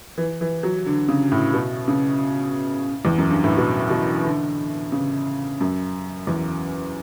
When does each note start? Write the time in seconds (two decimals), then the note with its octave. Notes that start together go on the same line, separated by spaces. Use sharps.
0.18 E3
0.41 E3
0.63 F#3
0.86 D3
1.09 C#3
1.32 A2
1.53 B2
1.88 C#3
3.05 E2
3.18 F#2
3.30 G2
3.44 A2
3.57 B2
3.90 B2
4.25 D3
4.92 C#3
5.60 F#2
6.27 E2